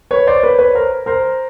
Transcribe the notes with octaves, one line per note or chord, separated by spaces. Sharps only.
B4 C#5
C5 D5
B4 C#5
B4 C#5
A#4 C5
A#4 C5